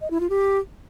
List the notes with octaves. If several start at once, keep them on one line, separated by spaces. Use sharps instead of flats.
D#5
E4
F4
G4